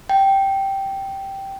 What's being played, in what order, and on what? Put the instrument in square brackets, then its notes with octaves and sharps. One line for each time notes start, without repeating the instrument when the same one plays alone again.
[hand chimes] G5